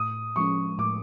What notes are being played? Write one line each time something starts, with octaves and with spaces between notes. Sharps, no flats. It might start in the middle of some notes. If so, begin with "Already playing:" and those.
Already playing: A2 D#6
F3 G#3 C#4 C#6
A2 D6